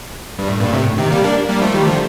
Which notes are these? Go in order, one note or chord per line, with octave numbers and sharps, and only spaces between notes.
G2
A2
G2 A#2
A2 C3
C3 D#3
G3 A#3
A#3 D4
G3 A#3
F3 A3
D#3 G3
D3 F3